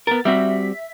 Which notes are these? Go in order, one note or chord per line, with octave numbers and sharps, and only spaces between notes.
B3 A#4 A6
G3 C4 F#4 E5 B6